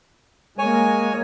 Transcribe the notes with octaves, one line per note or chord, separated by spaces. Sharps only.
G#3 A#3 C#5 G#5